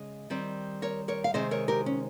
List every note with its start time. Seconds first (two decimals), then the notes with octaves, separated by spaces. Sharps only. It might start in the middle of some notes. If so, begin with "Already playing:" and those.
Already playing: C#3 G#3 D#5
0.30 D#3 G3 C4
0.82 A#4 C#5
1.08 A#4 C#5
1.24 F5
1.34 C3 D#3 G#3 C4 C5 D#5
1.51 A#4 C#5
1.68 G4 A#4
1.86 C#4